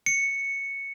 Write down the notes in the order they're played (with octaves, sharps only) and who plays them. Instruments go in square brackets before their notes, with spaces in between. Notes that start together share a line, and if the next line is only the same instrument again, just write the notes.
[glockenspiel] C#7